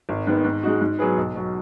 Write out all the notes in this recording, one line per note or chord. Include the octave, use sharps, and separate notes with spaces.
G#1
G#2 D#3 B3
G#2
G#3 D#4 F#4
G#2
F#3 B3 G#4 B4
B1
B2 F#3